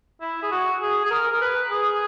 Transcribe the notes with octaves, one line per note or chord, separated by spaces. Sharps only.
E4
G#4
F#4
G#4
G#4
A#4
A#4
B4
G#4